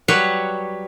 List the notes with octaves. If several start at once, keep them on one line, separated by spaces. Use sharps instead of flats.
F#3 G3 B4 C#5 F#5